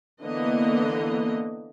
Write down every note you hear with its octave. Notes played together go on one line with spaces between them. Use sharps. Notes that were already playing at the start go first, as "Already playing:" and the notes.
D3 E3 A#3 B3 D#5